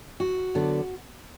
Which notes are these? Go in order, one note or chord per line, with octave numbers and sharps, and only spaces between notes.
F#4
D3 F#3 B3 D4